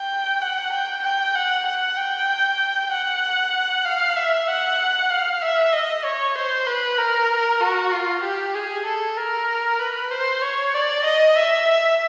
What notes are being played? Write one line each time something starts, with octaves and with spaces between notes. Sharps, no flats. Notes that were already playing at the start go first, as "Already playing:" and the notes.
Already playing: G5
F#5
G5
G5
F#5
F#5
G5
F#5
F5
E5
F#5
F5
E5
D#5
C#5
C5
B4
A#4
F#4
F4
G4
G#4
A4
A#4
B4
C5
C#5
D5
D#5
E5